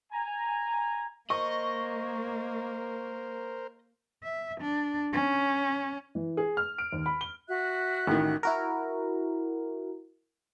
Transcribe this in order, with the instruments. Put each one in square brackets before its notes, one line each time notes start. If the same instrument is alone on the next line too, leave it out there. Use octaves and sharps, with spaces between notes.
[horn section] G#5 A#5
[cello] A#3 [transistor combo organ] A#4 C5 [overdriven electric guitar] D#5 [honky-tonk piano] C#6
[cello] E5
D4
C#4
[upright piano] E3
G#4
F6
D7
D#2
B5
G7
[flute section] F#4 E5 F#6
[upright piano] A1 D#3
[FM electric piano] E4 F#4 A#4